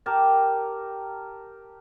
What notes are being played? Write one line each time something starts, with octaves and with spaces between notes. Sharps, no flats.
G4 A#4 A5